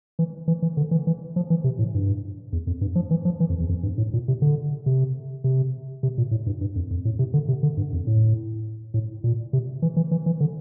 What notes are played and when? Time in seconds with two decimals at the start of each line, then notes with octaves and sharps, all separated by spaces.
0.19 E3
0.48 E3
0.62 E3
0.77 D3
0.91 E3
1.07 E3
1.36 F3
1.50 E3
1.64 C3
1.79 A2
1.95 G2
2.53 E2
2.67 F2
2.81 G2
2.95 F3
3.11 E3
3.25 F3
3.40 E3
3.49 F2
3.60 E2
3.69 F2
3.83 G2
3.98 A2
4.13 A#2
4.28 C3
4.42 D3
4.86 C3
5.44 C3
6.03 C3
6.18 A#2
6.31 A2
6.46 G2
6.61 G2
6.76 F2
6.91 F2
7.05 A2
7.19 C3
7.34 D3
7.48 C3
7.63 D3
7.77 G2
7.93 F2
8.07 A2
8.94 A2
9.24 A#2
9.53 C3
9.82 E3
9.97 E3
10.11 E3
10.26 E3
10.40 D3